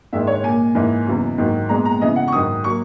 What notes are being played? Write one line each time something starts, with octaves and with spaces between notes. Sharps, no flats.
G#2 D#3 G#3 E5
C#5
A#2 A#3 G#5
G#2 E3 A#3
E2 C#3 F#3
G#2 D#3 F#3
A#2 G#3 B3 A#5
A#5
C#3 E3 B3 D#5
F#5
C#6
G#2 D#3 F#3 D#6
F#3 A#3 C#6